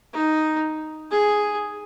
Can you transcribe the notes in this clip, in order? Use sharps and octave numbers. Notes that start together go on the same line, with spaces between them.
D#4
G#4